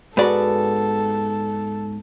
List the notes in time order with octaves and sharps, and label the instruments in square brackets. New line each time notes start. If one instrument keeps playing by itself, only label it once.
[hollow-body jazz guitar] G#2 D5 B5 [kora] B3 F#4 [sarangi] A4